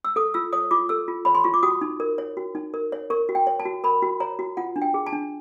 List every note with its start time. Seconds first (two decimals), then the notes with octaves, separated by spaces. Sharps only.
0.05 E6
0.16 A4 D#6
0.34 F4 E6
0.53 C#5 D#6
0.71 F4 D6
0.89 A4 E6
1.08 F4
1.25 C#5 B5
1.35 C6
1.44 F4 C#6
1.54 D6
1.63 F#4 D#6
1.81 D#4
2.00 A#4
2.18 C#5
2.37 F#4
2.55 D#4
2.74 A#4
2.92 C#5
3.10 A#4 C#6
3.29 F#4
3.35 G5
3.47 C#5
3.60 A5
3.65 F#4
3.84 A#4 B5
4.02 F#4
4.20 C#5 A#5
4.39 F#4
4.57 F4 F#5
4.76 D4
4.82 G5
4.94 G#4
5.07 A5
5.13 D4